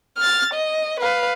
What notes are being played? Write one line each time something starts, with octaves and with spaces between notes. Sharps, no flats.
F6 A6
D#5
B4 F5